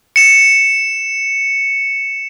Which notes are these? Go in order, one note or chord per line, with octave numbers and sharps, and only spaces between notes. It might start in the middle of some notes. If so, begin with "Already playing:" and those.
C#7 E7